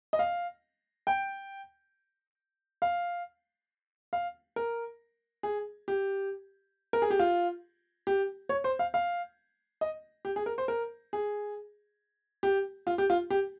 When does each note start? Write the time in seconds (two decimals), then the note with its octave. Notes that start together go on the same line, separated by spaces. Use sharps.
0.13 D#5
0.19 F5
1.07 G5
2.82 F5
4.13 F5
4.56 A#4
5.43 G#4
5.88 G4
6.93 A#4
7.02 G#4
7.10 G4
7.19 F4
8.07 G4
8.49 C#5
8.64 C5
8.79 F5
8.94 F5
9.81 D#5
10.25 G4
10.36 G#4
10.46 A#4
10.58 C5
10.68 A#4
11.13 G#4
12.43 G4
12.87 F4
12.98 G4
13.10 F4
13.30 G4